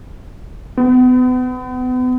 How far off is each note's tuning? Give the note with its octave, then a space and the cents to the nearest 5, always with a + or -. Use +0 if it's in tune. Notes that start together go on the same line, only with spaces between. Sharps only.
B3 +35